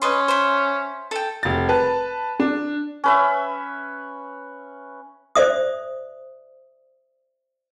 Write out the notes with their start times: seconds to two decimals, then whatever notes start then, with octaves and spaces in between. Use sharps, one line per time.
0.02 C#4 B4 D#5 C6
0.28 C5 E5
1.11 A4 G5
1.43 F1 A6
1.69 B4 A5
2.40 D4
3.04 C#4 B4 E5
5.35 C5 D5 E5 D#6